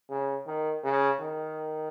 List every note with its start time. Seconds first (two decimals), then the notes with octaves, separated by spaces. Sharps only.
0.10 C#3
0.47 D#3
0.84 C#3
1.20 D#3